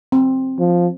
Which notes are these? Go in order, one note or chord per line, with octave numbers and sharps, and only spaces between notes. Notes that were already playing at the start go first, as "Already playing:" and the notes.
C4
F3